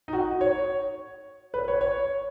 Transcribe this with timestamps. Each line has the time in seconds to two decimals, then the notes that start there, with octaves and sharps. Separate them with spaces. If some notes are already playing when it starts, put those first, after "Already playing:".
0.08 D#4
0.13 F#4
0.41 C#5
1.54 B4
1.68 C#5
1.81 C#5